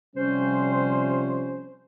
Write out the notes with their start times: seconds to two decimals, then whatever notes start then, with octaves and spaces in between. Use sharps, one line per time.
0.16 C3 F3 G3 C#4 C5